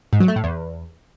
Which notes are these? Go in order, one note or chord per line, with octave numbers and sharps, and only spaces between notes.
G#2
F#3
A3
A2
E2